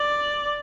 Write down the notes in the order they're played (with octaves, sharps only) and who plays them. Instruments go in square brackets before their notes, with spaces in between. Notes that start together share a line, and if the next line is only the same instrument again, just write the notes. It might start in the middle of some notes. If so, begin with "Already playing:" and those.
Already playing: [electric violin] D5